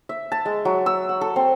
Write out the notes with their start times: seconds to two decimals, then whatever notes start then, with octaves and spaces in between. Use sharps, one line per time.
0.09 E5
0.32 A5
0.46 G#3
0.65 F#3
0.86 E6
1.09 F#5
1.21 A4
1.36 C4